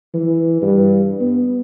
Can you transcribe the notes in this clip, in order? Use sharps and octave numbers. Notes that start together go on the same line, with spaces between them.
E3
G2
B3